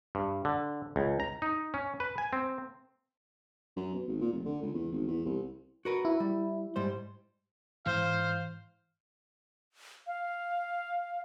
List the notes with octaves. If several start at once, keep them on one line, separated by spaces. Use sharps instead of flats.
G2
D3
C#2
A#5
D#4
C#4
B4
G#5
C4
F#2
B2
G#1
A#2
F1
D3
C#2
E2
G#1
E2
C2
F#4 A#4 B4
E4
G3
G#2 G3 C5
G#2 E3 C5 F5
F5